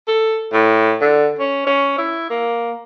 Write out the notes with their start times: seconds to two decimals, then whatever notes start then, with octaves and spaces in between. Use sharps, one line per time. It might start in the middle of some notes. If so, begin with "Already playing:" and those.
0.08 A4
0.53 A2
1.01 D3
1.39 C#4
1.66 C#4
1.98 E4
2.30 A#3